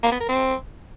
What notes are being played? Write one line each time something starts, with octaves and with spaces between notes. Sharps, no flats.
A#3
B3
A#4
C4